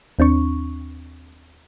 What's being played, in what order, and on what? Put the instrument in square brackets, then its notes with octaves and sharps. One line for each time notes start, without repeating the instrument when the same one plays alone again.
[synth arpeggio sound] D#2 C4 D4 C#6